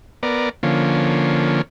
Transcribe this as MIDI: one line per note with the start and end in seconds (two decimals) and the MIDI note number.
0.23 0.49 59
0.23 0.49 70
0.23 0.49 74
0.63 1.62 50
0.63 1.62 53
0.63 1.62 58
0.63 1.62 61